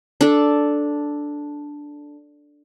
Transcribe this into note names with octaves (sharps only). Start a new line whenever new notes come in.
D4 A4